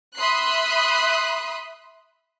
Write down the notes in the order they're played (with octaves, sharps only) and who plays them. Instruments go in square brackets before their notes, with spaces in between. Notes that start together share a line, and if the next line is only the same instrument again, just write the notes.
[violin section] E5 B5 C6 D#6 F#6 C7